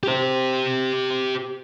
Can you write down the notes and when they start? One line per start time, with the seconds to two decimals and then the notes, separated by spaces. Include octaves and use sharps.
0.03 G4 C5